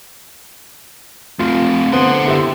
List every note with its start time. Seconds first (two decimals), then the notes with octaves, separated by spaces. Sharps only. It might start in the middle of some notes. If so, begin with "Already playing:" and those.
1.39 A3 C4 F4
1.92 D3 B3 C5 F#5 C6
2.26 E4 G4 E5